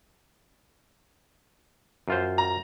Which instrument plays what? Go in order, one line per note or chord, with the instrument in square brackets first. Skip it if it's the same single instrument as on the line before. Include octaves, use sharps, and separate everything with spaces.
[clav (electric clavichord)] F#2 F4 C5
[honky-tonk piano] A#5